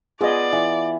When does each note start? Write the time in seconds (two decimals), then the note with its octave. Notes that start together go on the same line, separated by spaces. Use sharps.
0.21 B3 F4 G#4 D5 D#5
0.52 E3